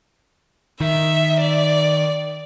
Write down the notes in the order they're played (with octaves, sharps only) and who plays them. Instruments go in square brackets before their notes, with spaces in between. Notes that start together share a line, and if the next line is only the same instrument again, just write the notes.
[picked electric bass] D#3 [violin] E5
[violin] D5